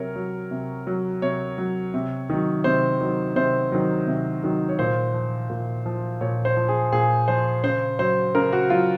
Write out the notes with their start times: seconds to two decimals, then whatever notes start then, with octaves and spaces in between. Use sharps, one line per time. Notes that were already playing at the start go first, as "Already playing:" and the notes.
Already playing: C3 F#3 A#4 C#5
0.16 F#3
0.51 C3
0.87 F#3
1.22 C3 C#5
1.58 F#3
1.94 C3
2.30 D#3 F#3
2.64 C3 C5
3.01 D#3 F#3
3.36 C3 C5
3.72 D#3 F#3
4.07 C3
4.43 D#3 F#3
4.69 C#5
4.79 A#2 C5
5.14 F3
5.50 A#2
5.86 F3
6.21 A#2 C#5
6.45 C5
6.56 F3
6.68 G#4
6.92 A#2 G#4
7.28 F3 C5
7.64 C#3 C5
7.99 F#3 C5
8.35 C#3 A#4
8.52 F#4
8.70 F#3 F4